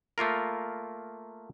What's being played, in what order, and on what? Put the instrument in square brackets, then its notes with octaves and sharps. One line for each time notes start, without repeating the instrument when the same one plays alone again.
[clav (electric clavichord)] A3 A#3 F4 A#4